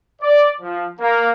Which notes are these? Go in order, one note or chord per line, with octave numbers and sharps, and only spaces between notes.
D5
F3
A#3